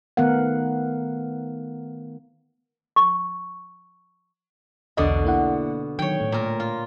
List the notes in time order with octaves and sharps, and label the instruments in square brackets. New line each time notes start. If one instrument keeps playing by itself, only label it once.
[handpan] D#3 A3 B3 A#4 F5 F#5
[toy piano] C#6
[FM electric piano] B1 E2 D#5 [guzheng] B2 D3 D5
[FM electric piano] A#3 E4 F#5
[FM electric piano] D#3 F#3 [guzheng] C#5 G5
[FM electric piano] A2 A3
[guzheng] A#2 A#4
F4